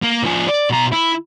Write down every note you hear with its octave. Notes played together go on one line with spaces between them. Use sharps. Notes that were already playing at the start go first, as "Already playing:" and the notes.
A#3
F3 G#4
D5
B2 A#5
E4